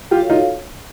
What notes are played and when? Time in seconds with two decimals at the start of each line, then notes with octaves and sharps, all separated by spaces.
0.11 F4 G4
0.20 F#4 A4 C#5 F5
0.30 D#4 F4